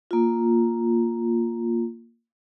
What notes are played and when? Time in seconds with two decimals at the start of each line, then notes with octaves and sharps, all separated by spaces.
0.11 A#3 F4